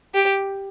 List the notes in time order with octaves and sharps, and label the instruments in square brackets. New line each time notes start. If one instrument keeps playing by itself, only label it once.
[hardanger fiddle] G4